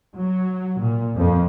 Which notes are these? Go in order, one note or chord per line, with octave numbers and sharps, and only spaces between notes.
F#3
A#2
F2